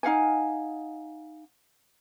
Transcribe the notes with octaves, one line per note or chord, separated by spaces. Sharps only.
D#4 F5 F#5 G#5